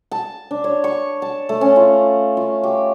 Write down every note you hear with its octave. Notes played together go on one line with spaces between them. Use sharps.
A5
D4
C#5
C#6
A5
A3
C#4
F4
F4
G4